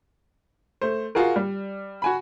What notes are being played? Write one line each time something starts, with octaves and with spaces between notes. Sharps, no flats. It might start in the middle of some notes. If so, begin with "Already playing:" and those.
A3 C5
F4 F#4 G#4 A#4
G3
F#4 G#5 B5